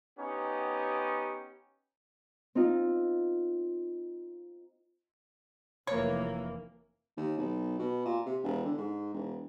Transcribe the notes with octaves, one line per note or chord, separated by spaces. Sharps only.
B3 C#4 D#4 G4
C4 D#4 F4
F1 E3 A#3 C#5
D#2
B1
B2
A#2
C3
E1
D3
G#2
E1